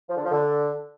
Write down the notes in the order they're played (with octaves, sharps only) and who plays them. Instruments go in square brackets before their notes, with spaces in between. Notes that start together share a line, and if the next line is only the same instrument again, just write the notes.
[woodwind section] F3
D3
F3
D3